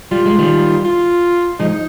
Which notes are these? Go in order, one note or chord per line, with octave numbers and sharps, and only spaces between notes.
G3 F4
G#3
D#3 G3
F4
F3 G#3 D#4